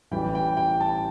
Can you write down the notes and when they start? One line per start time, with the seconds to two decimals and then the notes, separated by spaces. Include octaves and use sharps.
0.11 A1 A2 E3 G3 G5
0.35 G5
0.57 G5
0.80 A5